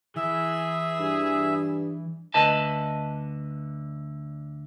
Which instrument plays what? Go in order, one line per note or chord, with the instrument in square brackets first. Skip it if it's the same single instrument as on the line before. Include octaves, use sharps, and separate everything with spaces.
[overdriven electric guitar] E3 [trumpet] G#4 [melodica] E5
[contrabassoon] G2
[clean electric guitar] D2 D3 B4 D#5 A5